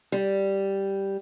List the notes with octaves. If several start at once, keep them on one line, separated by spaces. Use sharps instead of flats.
G3